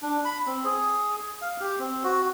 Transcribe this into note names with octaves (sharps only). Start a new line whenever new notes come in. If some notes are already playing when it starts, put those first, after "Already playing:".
D4
B5
C4
G#4
F5
G4
C4
F#4